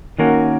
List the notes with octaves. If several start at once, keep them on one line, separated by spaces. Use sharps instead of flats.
D#3 A#3 C#4 F#4 A#4